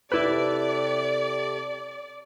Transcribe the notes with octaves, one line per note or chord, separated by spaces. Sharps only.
C3 E4 G4 A4 B4 D5